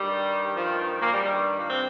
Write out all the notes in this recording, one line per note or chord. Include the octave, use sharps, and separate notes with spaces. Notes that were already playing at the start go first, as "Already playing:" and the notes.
Already playing: G2 D#3 G3
F3
A#2 A#3
G3
G2 D#3 G3
A#2 A#3
C3 C4